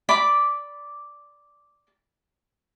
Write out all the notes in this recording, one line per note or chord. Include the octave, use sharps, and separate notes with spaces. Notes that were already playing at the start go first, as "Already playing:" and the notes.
D5 B5 D6